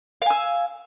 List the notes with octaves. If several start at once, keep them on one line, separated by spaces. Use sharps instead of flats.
F5 G#5 E6